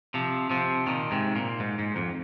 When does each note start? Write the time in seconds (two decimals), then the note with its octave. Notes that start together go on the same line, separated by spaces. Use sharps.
0.14 C3 F3
0.50 C3 F3
0.87 A#2 D#3
1.11 G#2 C3
1.36 A#2
1.60 G#2
1.79 G#2
1.96 F2